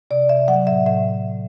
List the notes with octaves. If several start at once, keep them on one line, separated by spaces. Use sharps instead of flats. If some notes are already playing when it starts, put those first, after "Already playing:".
C3 D5
C3 E5
F#3 F#5
A2 E5
A2 E5